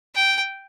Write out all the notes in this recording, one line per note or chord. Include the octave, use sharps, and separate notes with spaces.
G5